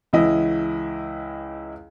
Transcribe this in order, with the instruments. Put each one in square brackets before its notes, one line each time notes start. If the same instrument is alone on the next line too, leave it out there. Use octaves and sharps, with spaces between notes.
[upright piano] C#2 E3 E4 D#5